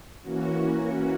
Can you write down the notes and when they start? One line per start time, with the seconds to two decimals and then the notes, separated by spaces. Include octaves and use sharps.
0.23 E3 A#3 C#4 F#4